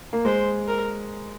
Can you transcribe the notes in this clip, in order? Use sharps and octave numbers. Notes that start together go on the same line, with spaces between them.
A#3
G#3 C5
A#4